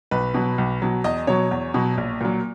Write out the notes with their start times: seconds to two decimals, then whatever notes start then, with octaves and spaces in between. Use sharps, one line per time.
0.11 B1 B4
0.34 B2 F#3
0.58 B1
0.82 B2 F#3
1.04 E2 D#5
1.27 B2 F#3 C#5
1.51 E2
1.74 B2 F#3
1.98 A#1
2.21 A#2 F#3